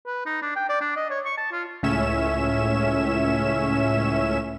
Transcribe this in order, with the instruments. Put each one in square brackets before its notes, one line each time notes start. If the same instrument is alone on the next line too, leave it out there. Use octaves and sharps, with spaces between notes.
[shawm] B4
D#4
D4
G5
D5
D4
D#5
C#5
C#6
A5
F4
[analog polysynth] C#2 A2 C#4 E5 E7